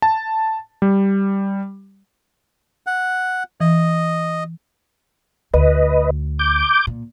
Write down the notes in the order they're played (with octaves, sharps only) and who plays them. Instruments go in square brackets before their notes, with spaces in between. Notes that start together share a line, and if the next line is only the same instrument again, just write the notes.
[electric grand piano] A5
G3
[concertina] F#5
[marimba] E3 [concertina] D#5
[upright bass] D2 [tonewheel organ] B4 D#5
[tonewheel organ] D6 G6
[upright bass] A#2